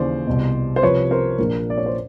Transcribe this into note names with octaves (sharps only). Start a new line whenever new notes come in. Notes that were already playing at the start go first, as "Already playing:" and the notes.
Already playing: D#2 C#3 E3 C5 D5
C2 B2
C5
C2 C3 F3 B4 C#5
A#4 C5
A#1 A#2 F3 A#4
D5
C#5
C5